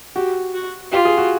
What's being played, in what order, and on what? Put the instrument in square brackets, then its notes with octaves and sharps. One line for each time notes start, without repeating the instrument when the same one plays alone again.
[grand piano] F#4 [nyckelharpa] G4
[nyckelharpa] F#4
[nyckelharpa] F4 [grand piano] G4
[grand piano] G#4
F#4